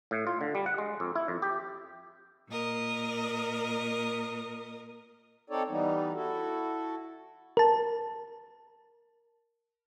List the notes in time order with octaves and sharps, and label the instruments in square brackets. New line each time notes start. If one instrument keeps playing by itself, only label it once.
[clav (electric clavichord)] A2
F4
D3
G3
F#5
G#3
F2
E4
F2
G4
[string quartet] A#2 A#4 D#5
[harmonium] C4 D#4 A4 C#5 D5
E3 G3 B3 D#4
E4 F#4 A4
[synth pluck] A#4 A5